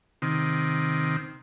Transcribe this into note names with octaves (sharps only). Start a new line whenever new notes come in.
C3 D#3